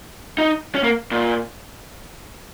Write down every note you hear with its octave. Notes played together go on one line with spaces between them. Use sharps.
D#4
C#4
A#3
A#2